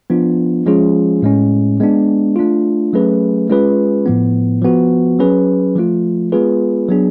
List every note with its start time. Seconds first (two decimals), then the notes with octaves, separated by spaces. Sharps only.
0.10 F3 B3 D4 F4
0.66 F3 G#3 C#4 F4 G#4
1.22 A2 G#3 C#4
1.80 G#3 B3 D4
2.36 A3 D4 F4
2.93 F#3 A3 C#4 G#4 B4
3.50 G#3 C#4 F4 G#4 B4
4.06 A2 F3 B3
4.62 F3 B3 F#4
5.19 F#3 C#4 G#4 B4
5.76 F3 A3 F4
6.32 G#3 B3 F4 G#4 B4
6.89 F#3 B3 D4 G#4